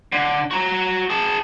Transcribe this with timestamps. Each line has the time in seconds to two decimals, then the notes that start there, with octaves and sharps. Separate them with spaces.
0.12 D3
0.51 F#4 A#5
1.10 G#4 A5